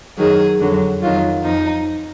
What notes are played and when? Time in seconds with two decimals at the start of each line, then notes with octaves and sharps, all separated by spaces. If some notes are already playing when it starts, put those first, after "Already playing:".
0.17 F#2 D#3 F#3 G#4
0.60 F2 D3 F#3
1.02 F2 D#3 F#3 F4
1.44 F2 F3 D#4